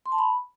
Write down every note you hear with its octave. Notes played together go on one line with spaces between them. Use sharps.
C6
A5
B5